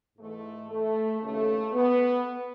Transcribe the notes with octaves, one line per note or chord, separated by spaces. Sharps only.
G#2 E3 A3
A3
D#2 C#3 E3 A3
B3